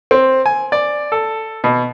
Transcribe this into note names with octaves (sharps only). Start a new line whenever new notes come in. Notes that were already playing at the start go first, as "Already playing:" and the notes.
C4
G#5
D5
A4
B2